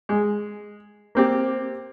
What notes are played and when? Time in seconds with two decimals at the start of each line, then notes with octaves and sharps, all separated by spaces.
0.09 G#3
1.15 A#3 C4 G4